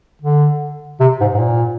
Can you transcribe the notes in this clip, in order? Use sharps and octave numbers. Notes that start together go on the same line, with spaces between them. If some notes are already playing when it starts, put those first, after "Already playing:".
D3
C3
G#2
G#2
A#2